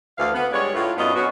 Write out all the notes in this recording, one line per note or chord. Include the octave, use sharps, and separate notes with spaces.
D2 E3 F5
B3
G3 G#3 D4 C#5
A2 F4
F#2 B3 C#4 D4 F4 D#5
B2 C#4 F#4